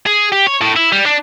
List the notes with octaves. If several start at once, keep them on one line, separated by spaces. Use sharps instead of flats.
G#4
G4
C#5
A2
E4
G3
D4